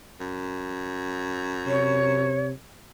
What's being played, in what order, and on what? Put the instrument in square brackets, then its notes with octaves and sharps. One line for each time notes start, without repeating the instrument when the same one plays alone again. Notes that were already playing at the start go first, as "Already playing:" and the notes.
[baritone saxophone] F#2
[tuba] C3 [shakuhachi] C#5